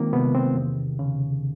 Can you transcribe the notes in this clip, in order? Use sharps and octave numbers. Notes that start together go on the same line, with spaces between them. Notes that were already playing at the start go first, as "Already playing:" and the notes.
Already playing: D#3 G#3 A#3 C4 F4
C3 B3
C4
E2
C#3